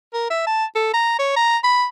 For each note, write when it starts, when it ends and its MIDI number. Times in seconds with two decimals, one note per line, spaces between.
0.13 0.29 70
0.30 0.43 76
0.46 0.65 81
0.75 0.90 69
0.93 1.15 82
1.19 1.33 73
1.36 1.57 82
1.64 1.85 83